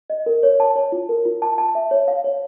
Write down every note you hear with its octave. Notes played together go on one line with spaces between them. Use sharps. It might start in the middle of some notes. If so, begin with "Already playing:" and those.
D#5
A#4
C#5
A5
C#5
F4
A#4
F4
A5
A5
E5
C#5
F5
C#5